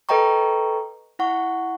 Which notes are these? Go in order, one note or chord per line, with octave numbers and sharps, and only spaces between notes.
A4 B4 D#5 G5 A#5 C#6
E4 F#5 C#6